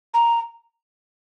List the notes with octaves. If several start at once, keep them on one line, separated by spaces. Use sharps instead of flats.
A#5